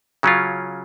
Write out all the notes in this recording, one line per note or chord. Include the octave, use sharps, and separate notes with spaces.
C#3 F#3 C#4 F4